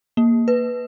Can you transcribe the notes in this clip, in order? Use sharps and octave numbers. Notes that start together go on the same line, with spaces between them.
A#3
B4